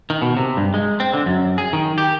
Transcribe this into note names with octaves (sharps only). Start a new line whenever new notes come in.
D#3
B2
C3
G2
G#3
C4
D3
F#2
G#4
D#3
G4